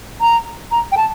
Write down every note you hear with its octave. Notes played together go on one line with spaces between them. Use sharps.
A#5
A#5
G5
A5